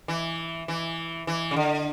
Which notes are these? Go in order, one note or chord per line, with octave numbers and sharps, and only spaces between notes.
E3
E3
E3
C#3
D3